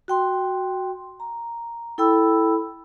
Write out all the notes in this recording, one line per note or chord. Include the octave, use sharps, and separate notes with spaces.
F#4 G5 C6
A#5
E4 A4 G5 B5 E6